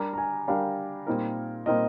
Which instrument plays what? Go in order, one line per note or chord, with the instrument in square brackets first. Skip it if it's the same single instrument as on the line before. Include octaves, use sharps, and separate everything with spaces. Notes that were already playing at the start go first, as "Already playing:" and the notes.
Already playing: [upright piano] G3 D4 G4 A#4 [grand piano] A#5
[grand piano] A#5
G#5
[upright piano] G3 D4 G4 A#4 [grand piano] F5
[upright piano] A#2 G3 C4 D#4 A#4
[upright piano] A#2 G3 C4 D#4 A#4 [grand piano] D#5